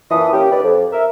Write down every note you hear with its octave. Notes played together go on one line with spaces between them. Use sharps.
F#2 A#2 E3 E5 A5 D#6
A#3 C#4 G4
D#2 B4 D5
F2
A#4 E5